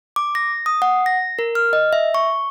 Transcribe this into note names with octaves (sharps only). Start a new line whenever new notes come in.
D6
A#6
D#6
F#5
A#6
A#4
F6
D#5
E5
C#6